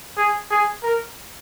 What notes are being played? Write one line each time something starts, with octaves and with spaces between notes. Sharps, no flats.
G#4
G#4
A#4